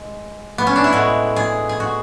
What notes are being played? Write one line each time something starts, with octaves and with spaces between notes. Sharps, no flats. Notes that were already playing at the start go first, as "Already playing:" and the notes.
Already playing: G#3
B3
C#4
D4
E4
A2 G#3 F#4
G#4
G#4
F#4